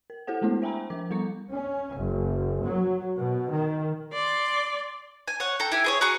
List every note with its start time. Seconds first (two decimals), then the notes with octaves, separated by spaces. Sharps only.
0.10 A#4
0.27 E4 G4 A4 C5 F#5
0.42 G#3 A3 B3 D4 E4
0.62 C5 E5 G5 G#5 A#5 B5
0.90 F3 A#4 D6
1.10 G3 B3 A4 A#5 C#6 C#7
1.51 C#4
1.96 F#1
2.63 F#3
3.17 B2
3.51 D#3
4.13 D5 C6
5.28 G#5
5.40 C#5 F#5
5.60 A4 G5 A#5
5.72 E4 G4 G#5
5.84 G#4 C5 C#5
6.01 F#4 G#4 A#5 C#6